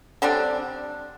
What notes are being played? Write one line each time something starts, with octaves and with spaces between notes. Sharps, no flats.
D3 G3 C4 D4